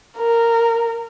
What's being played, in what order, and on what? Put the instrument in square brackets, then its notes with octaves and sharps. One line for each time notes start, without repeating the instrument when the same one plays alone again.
[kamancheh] A#4